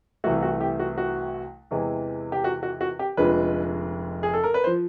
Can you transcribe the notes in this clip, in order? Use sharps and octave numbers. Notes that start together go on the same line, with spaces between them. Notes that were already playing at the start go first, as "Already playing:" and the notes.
C2 C3 E3 A3 F#4
F#4
G4
F#4
F#4
E2 C3 E3 G#3
G4
F#4
F#4
F#4
G4
F1 F2 D3 F3 G#3 B4
G#4
A4
A#4
B4
C5
F3